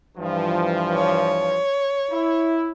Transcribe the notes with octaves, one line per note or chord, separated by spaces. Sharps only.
G2 E3 F3
C#5
E4